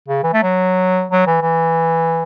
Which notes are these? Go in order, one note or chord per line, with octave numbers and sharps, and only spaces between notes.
C#3
E3
A3
F#3
F#3
E3
E3